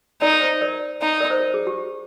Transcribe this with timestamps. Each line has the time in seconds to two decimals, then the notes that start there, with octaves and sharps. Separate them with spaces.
0.21 D#4 A#4 D5
0.41 C5
0.61 A#4 D5
1.01 D#4
1.20 A#4 D5
1.30 C5
1.40 A#4
1.54 G#4
1.67 G4